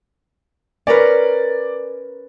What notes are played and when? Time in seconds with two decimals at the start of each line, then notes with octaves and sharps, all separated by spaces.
0.87 C#4 A#4 B4 D5